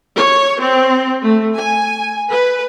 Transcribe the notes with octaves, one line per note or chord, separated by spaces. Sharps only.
C#5
C4
A3
G#5
B4